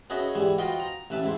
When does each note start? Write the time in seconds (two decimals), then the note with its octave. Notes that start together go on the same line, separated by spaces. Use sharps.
0.10 B3 C#4 F#4 G#4 D#5 E5
0.35 G#2 E3 G3
0.58 F4 F#4 B4 C5 D#5 G5
0.80 A#5
1.10 A1 E3 B4 E5 A5
1.24 G#2 E4 C5